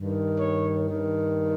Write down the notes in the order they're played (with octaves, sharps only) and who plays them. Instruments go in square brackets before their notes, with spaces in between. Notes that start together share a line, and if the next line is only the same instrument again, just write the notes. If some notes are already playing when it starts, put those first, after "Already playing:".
Already playing: [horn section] G2 D#3
C#5
G2 D#3